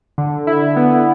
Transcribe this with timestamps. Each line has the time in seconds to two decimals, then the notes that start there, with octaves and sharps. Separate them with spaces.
0.18 D3
0.47 E4
0.76 B3